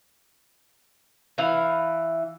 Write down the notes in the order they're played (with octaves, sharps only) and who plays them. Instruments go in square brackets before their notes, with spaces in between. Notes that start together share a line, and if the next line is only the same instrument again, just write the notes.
[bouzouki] E3 E4 F5